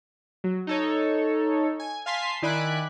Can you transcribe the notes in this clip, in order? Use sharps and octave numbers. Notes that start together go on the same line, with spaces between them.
F#3
D#4 A4 C#5
G#5
F5 G#5 A5 C6 B6 C7
D#3 E4 D5 G#5 B5 F#6